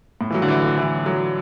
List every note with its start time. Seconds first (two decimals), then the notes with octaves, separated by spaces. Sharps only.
0.21 A2
0.30 E3
0.35 F#3
0.42 D3
0.48 E3
0.63 D3
0.77 E3
1.06 F#3